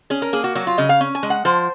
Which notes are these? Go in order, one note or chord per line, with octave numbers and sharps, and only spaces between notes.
C#4 G#4
A#4
A#3 G#4
F#4
F#3 F#4
F4
C#3 D#5
F5
C#4
G#5
G#3
F#5
F3 C5